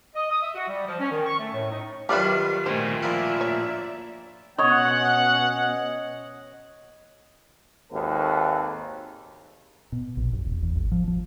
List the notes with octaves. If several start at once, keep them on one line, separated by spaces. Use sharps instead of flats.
D#5
D#6
E5
F#4
G3
F3
C#4
D#3
C#6
A3
A2
D#4
D#3 F#3 G3 F4 G4 B4 D5 E5
D2 A#2 D#3 A3 C5
F3 A#3 E4 D5 E5
C#5
B2 C#4 C#5 D#5 F#5
G#1 D#2 G#2 A4 B4
B2
A#1
F#1
E1
E2
G#1
F3
F3